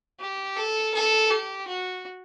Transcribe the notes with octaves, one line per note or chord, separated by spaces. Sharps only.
G4
A4
A4
G4
F#4